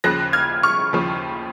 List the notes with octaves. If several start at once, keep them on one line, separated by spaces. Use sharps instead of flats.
D#2 C#3 F3 F#6 A#6
F6 G#6
C#6 F6
D#2 C#3 F3